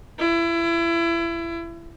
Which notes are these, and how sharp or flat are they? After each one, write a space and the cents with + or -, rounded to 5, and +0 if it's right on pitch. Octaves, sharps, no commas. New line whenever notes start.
E4 +30